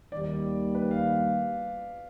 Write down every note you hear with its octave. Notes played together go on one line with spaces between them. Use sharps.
D#2 D#3 G3 A#3 D5
B4
F5